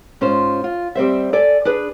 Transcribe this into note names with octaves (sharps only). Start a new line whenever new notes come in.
G#2 C#4 F4 C5
F4
G3 C4 C5 E5
A4 D5 E5 G#5
D4 G#4 B4